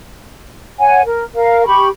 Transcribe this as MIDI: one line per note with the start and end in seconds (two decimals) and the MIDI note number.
0.80 1.01 73
0.80 1.01 78
0.80 1.01 80
1.06 1.24 70
1.35 1.64 70
1.35 1.64 77
1.66 1.88 67
1.66 1.88 83
1.66 1.88 85